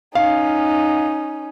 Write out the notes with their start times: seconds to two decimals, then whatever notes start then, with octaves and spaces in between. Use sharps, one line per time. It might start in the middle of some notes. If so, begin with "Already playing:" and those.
0.15 C#4 D#4 F5